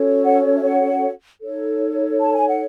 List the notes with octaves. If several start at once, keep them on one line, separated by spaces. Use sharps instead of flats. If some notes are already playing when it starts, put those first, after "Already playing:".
Already playing: C#4 F#4 A4 C#5
F#5
E5
F#5
D#4 A4 C#5
A5
G#5
F#5